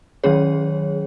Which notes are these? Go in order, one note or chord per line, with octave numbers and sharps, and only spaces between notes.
D#3 F#3 C#4 G#4 C#5